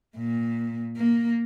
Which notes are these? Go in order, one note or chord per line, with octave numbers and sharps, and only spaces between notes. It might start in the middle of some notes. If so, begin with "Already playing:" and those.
A#2
A#3